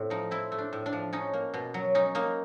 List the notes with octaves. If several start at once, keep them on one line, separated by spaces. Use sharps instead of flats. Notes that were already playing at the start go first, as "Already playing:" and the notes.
Already playing: A2 A3 C4
F3 D#4
C4 E4
A3
D4
A2
D4
F3
C#4 D#4
A#3
B2
F#3
C#4 D#4
A#3 D#4